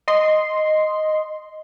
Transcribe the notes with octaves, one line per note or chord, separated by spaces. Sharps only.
D#5 C6